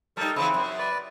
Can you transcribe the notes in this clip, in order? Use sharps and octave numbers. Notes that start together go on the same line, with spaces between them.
G3 D#4 A4 A#4
C#3 E3 C4 E4
F#2
B4 D5